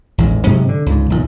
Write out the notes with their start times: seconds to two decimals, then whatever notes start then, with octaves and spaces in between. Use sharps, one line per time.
0.18 A1 E2 G#2
0.47 G#2 C3 F#3 G#3
0.69 D3
0.86 C#2 G#2
1.10 B1 E2 A#2